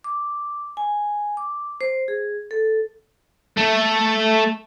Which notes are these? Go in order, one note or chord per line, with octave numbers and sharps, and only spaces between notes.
D6
G#5
D6
C5
G#4
A4
A3